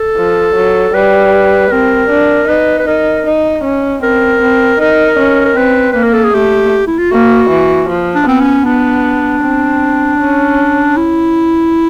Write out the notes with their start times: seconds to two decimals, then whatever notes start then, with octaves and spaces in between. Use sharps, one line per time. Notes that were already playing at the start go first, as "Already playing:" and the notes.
Already playing: A4
0.17 F3
0.55 F#3
0.94 G3 B4
1.71 C4 A#4
2.10 D4
2.48 D#4 B4
2.79 B4
2.87 D#4 A#4
3.26 D#4
3.64 C#4
4.02 C4 A#4
4.42 C4
4.80 D#4 A#4
5.19 C#4
5.45 A#4
5.57 C4 B4
5.92 A#3 B4
6.03 A#4
6.13 A4
6.24 G#4
6.34 A3 G4
6.87 E4
6.98 F4
7.11 A#3 F#4
7.50 E3
7.89 F3
8.15 D4
8.27 B3 C4
8.41 C#4
8.65 B3 D4
9.43 C4
10.20 C#4
10.97 E4